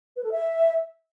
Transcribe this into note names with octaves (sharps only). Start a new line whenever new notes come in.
B4
A4
E5